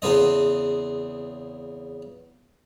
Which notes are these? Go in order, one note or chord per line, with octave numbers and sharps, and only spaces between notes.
E2 C#3 C4 D#5